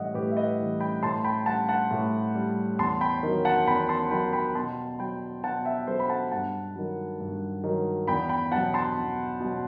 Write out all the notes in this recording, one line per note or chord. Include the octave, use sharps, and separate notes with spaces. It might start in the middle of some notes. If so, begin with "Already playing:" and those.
Already playing: A2 E3 G3 D#5 E5 F#5
A2 G4 B4
E5
B4 D#5
E3 G3
G5 B5
A2 A5 C6
G5 B5
G3 F#5 A5
F#5 A5
A2
G3
E2 A5 C6
G5 B5
D#3 F#3
F#5 A5
E2 G5 B5
A5 C6
D#3 F#3 G5 B5
G5 B5
B2 A5 C6
F#3 G5 B5
B2 F#5 A5
E5 G5
F#3 A4 C5
B5
F#5 A5
G2 F#5 A5
D#3 F#3
G2
D#3 F#3
E2 G5 B5
G5 B5
B2 F#3 F#5 A5
A5 C6
E2
B2 F#3